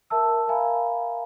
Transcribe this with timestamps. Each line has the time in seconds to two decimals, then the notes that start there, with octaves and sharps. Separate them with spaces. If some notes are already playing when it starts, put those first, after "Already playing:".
0.10 A#4 E5 A5 E6
0.48 A#4 E5 F5 G#5 A#5 B5